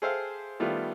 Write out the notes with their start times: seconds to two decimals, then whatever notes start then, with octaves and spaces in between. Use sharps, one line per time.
0.02 G#4 A4 C5 E5 F5 G5
0.60 D#3 G3 A3 B3 F4